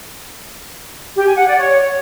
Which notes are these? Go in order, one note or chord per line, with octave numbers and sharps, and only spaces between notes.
G4
G#5
F#5
D5
C#5